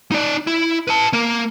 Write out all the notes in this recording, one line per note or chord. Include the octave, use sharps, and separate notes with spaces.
D#4 D5
E4
B4 A5
A#3 A#4